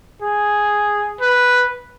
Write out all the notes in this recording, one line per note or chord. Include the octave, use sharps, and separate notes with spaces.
G#4
B4